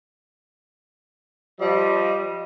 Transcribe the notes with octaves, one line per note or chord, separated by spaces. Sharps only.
F3 G3 D#5